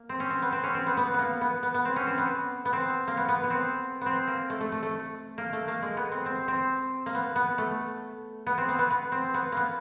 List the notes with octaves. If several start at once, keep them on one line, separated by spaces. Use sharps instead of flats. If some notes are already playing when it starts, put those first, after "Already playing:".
Already playing: A#3
C4
C#4
C4
B3
C4
C#4
C4
B3
B3
A#3 B3
B3
B3
B3
C4
C#4
C4
B3
B3
C4
A#3
B3
B3
B3
C4
B3 C4
A#3
A3
A3
A3
A3
A#3
A3
A#3
G#3
B3
C4
C4
C4
A#3
B3
B3
A3
B3
C4
B3
B3
B3
C4
B3
A#3 B3